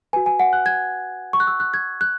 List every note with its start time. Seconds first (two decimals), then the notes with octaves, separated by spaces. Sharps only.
0.13 F#4 B4 G#5
0.26 G#5
0.40 F#5
0.53 F#6
0.66 G#6
1.33 C#6
1.40 F#6
1.47 E6
1.60 F#6
1.74 G#6
2.01 F#6